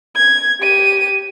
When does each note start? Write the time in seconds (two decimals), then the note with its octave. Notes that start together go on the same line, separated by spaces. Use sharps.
0.16 G#6
0.61 G4 D#7